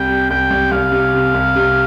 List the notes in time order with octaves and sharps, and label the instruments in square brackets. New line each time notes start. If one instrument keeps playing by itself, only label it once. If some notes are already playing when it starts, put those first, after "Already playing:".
Already playing: [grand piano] C2 [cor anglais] G5
[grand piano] G3
[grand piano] C2 [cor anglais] G5
[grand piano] C2
[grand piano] C2 [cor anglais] F5
[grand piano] C3
C3
C2
C3